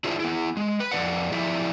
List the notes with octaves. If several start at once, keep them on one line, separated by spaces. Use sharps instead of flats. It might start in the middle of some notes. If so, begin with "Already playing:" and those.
D4 E4 F4 G#4 C5 E5
B3 E4
G#3
B4
F2 A3 D5 F#5
F3 E4 G4 D5 E5